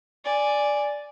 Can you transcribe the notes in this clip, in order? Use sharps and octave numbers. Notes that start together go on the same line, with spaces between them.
D5 G#5